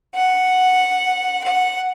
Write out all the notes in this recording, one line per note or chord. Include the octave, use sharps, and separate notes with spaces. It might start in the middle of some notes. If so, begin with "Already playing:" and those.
F#5
F#5